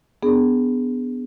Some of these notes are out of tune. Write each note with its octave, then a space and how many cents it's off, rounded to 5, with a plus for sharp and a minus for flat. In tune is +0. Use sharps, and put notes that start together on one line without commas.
B3 +15 D4 +0 G#4 +0